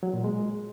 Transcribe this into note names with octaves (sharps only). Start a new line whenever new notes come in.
F#3
A#2
G#3